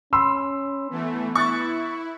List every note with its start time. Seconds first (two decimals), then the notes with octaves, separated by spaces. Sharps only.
0.13 C#4 B5 C6 E6
0.91 E3 A3 B3
1.35 E4 C#6 F#6 A6